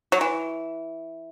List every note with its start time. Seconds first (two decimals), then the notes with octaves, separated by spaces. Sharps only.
0.12 F#3
0.21 E3